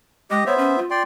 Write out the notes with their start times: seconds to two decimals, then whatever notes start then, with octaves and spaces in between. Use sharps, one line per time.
0.31 G#3 G4 D#5
0.46 B3 C5 C#5 E5
0.58 C#4
0.78 F4
0.90 D5 G5 C6